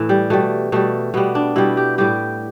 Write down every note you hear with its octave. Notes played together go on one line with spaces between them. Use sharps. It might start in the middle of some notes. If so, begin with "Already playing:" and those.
Already playing: A2 E3 A3
G3
B2 G3 A3
B2 G3 A3
B2 G3 B3
D4
B2 G3 E4
G4
A2 G3 G4